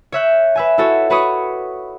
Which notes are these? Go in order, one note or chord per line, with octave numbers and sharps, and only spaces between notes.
C#5 E5 F#6 G6
B4 E5 G#5
E4 F#4 A4 C#5
F#4 B4 C#5 B5 C#6 D#6